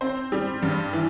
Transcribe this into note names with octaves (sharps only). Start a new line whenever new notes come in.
C4 C5
G3
G2
E3